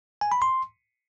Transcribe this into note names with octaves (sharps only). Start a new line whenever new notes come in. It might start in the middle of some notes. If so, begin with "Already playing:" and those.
G#5
B5
C6